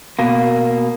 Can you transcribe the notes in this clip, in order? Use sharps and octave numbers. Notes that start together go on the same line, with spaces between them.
B2 A#3